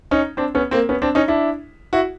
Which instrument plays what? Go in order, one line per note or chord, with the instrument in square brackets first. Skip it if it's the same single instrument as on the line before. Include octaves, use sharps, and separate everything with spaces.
[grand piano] C#4 D#4
C4 D4
B3 C#4
A#3 C4
B3 C#4
C4 D4
C#4 D#4
D4 E4
E4 F#4